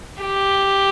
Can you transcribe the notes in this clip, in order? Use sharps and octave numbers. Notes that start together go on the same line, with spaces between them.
G4